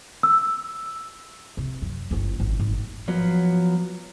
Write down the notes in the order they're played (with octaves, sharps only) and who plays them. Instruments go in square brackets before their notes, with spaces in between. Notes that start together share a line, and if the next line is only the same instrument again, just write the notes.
[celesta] E6
[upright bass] C3
F#2
G1 C#4
G#1
G#1
[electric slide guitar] F3 F#3 B3